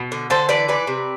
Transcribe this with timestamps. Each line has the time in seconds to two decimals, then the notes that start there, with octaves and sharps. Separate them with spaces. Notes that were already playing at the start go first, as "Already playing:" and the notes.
Already playing: B2
0.12 D3
0.30 D3 A4 C5
0.49 E3 B4 D5
0.68 E3 B4 D5
0.87 C3